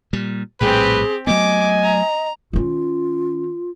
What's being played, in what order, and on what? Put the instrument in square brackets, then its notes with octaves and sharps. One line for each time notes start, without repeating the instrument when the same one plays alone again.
[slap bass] A#2 G3
[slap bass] A#1 A2 G3 [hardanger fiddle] C4 G4 [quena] G#4 [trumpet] B4
[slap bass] F#3 A3 B3 [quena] D#5 [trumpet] G#5 [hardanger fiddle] D6
[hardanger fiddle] A#5
[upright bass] D#3 C#4 [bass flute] F4